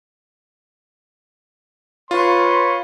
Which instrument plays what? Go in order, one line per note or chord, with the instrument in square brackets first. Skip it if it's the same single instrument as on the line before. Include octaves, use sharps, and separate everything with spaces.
[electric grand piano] F4 [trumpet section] B4 C#5 C6